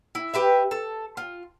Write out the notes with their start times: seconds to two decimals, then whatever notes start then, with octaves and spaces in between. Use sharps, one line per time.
0.15 E4
0.34 G4 B4 E5
0.71 A4
1.17 F4